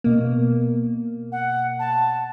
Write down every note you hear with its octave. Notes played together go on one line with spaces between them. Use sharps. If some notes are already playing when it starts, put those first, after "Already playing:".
B2 A#3
F#5
A5